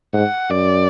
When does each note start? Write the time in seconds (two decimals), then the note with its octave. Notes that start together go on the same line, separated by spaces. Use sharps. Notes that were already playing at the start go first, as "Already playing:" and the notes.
0.13 G#2 F#5
0.49 F#2 D5